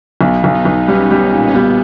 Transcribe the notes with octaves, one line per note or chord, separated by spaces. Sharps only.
B1 B3
B1
D#4
B1
G3 C#4
G3
A#2
C#4
G3 B3